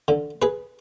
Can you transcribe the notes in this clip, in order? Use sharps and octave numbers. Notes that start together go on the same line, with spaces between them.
D3
G#4 B4